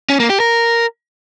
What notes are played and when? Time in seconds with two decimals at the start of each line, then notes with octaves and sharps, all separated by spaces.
0.10 C#4
0.20 A#3
0.30 G4
0.40 A#4